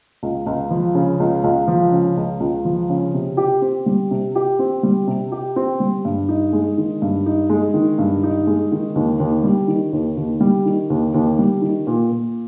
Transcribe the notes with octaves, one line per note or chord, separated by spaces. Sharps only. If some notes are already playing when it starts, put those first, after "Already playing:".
C#2
C#2
F3
C#3
C#2
C#2
F3
C#3
C#2
C#2
F3
C#3
C3
G4
C4
G3
C3
G4
C4
G3
C3
G4
C4
G3
G2
D#4
G#3
D#3
G2
D#4
G#3
D#3
G2
D#4
G#3
D#3
D#2
D#2
G3
D#3
D#2
D#2
G3
D#3
D#2
D#2
G3
D#3
A#2
A#2